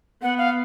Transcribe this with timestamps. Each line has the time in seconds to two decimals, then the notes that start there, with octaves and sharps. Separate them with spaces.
0.22 B3 F#5
0.38 F5